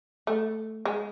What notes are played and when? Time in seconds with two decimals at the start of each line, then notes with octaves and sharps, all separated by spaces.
0.27 A3
0.85 G#3